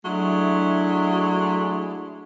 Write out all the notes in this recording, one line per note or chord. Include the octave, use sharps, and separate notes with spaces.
F#3 G#3 A3 D4 E4